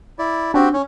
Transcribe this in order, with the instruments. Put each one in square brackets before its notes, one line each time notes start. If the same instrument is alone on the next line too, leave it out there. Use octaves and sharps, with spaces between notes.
[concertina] E4 D5
[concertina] C4 F#4 G4 [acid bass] D4
[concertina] C#4